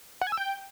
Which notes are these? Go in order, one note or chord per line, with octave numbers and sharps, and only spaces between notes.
F#5
G#5
E6
G5